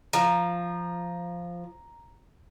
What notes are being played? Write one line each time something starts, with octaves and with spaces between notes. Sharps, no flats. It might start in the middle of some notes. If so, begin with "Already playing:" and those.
F3 A#5